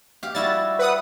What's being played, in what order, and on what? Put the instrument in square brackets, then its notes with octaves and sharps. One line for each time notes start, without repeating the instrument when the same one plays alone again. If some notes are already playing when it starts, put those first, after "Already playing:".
[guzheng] G4 F5
[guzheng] G3 E4 F#4 [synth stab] A6
[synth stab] B4 F#5 D#6